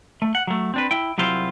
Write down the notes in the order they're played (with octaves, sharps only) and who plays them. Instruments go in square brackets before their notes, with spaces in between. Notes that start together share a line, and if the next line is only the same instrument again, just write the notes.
[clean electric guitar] A3
F#5
F#3 A3
C4 D4 B4
E4 G5
C2 F#3 E4 F4 G4 C5